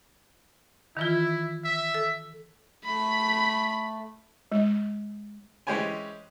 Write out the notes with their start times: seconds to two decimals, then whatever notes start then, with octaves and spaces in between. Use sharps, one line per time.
0.97 D#3 E3 E4 F4
1.64 E5
1.94 A4
2.85 A3 B5
4.52 G#3
5.67 E3 G#3 C#4 G4 C5 G#5